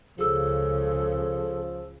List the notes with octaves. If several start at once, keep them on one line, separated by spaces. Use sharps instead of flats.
C#2 C#3 F3 G#4 A4 E6